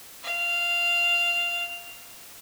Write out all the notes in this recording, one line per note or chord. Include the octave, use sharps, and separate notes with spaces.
F5